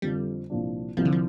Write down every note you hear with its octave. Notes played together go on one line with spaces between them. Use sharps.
F2 D3 F3 G3
C2 A#2 F3 D4
C2 C3 F3 G3 C4 F4
D3
F3